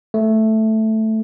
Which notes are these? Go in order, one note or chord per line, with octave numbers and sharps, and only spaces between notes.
A3